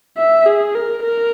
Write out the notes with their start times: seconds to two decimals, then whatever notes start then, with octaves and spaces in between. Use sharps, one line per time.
0.18 E5
0.46 G#4
0.75 A#4
1.03 A#4